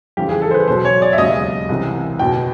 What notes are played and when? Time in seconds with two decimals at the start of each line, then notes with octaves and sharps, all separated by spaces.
0.17 F2 C#3 E3 G3 G4
0.29 G#4
0.42 A4
0.51 C5
0.54 B4
0.68 E2 B2 F#3 C5
0.85 C#5
1.02 D5
1.13 E5
1.18 E1 D#2 C#3 F#3 D#5
1.69 C2 C3 E3
2.19 F#1 E2 B2 G5